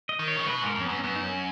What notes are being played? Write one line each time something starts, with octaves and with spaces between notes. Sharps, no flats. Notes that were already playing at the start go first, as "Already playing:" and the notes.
D#5
D#3
C#5
C#3
B2 B4
B4
G#2 A#4
F2
C#4
F#2 B3
C#4
F#2 B3
D#4
C#4